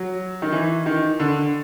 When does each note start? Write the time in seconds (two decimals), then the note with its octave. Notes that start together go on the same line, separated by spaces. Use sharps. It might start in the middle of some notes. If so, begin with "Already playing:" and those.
Already playing: F#3
0.42 D#3
0.52 E3
0.86 D#3
1.20 D3